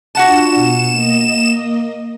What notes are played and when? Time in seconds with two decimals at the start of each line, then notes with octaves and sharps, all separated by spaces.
0.15 D4 F4 F#4 F#5 A5 E7
0.55 B2 C#7
0.91 A#3 D#5